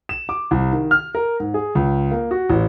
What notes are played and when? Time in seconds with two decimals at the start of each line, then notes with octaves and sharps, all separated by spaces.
0.09 E7
0.29 D6
0.51 C2
0.72 D#3
0.91 F6
1.15 A#4
1.40 G#2
1.54 G#4
1.75 C#2
2.11 A#3
2.31 F#4
2.50 A1